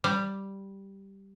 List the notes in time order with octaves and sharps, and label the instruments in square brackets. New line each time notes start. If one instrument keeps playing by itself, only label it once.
[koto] G3